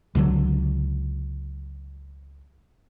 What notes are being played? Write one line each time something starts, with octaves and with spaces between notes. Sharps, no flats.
C#2 D3 F#3